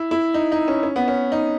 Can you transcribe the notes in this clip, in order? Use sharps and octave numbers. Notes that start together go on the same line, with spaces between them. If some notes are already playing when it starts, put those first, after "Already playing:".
Already playing: E4
E4
D#4
D#4
C#4
C#4
B3
C#4
D#4